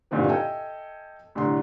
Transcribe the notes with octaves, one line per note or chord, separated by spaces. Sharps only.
C2 G2 A#2 D3 D#3 C4
A4 D#5 E5 G5 G#5
C2 A2 D3 C6